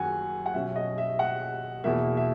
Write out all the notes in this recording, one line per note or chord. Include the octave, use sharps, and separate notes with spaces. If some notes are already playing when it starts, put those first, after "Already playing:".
Already playing: F#2 D#3 F#3 F#5 G#5
F#5
B2 F#3 C#4 E5
D#5
E5
F#5
E2 B2 A#3 E5
E5